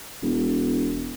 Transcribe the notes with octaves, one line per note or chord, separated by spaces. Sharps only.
E1